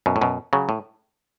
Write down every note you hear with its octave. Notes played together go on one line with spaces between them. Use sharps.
F#2 B2
A2
F#2 B2
C#3 F#3
A2